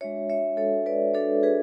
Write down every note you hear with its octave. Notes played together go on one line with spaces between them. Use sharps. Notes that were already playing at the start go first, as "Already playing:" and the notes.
G#3 D4 F#4 C#5 E5
C#5 E5
G#3 D4 F#4 A4 C#5
B4 D5
G#3 D4 F#4 A4 C#5
G#4 B4